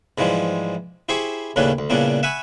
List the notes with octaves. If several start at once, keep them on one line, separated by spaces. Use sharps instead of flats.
G#2 E3 F3 G3 G#3
E4 G4 G#4 C5 B5 C#6
D#2 A2 C#3 C#4 D4 B4
D2
A#2 C#3 G3 B3 D4 E4
E5 F#5 G#5 B5 C#6